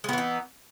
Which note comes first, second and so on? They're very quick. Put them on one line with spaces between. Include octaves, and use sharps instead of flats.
G#3 B3 E3 D#4